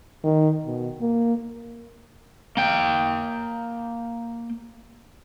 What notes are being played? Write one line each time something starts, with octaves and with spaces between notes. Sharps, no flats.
D#3
B2
A#3
A#3 G5